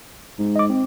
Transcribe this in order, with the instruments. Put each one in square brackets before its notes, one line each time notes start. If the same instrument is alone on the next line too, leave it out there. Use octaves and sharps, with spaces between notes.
[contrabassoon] G#2
[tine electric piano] D#5 D6
C4